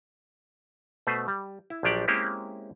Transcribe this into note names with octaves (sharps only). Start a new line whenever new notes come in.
B2 A3 B4 C5
G3
E4
A#1 F3 F#3 D4 G4 D5
G#3 A#3 C4 C#4 E4 G4